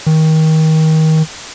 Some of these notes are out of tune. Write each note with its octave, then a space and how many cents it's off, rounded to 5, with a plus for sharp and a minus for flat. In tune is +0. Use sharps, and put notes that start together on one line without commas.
D#3 +25